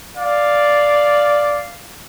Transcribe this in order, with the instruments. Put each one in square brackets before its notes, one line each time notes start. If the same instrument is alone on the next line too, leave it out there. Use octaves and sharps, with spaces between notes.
[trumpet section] D5 [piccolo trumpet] F5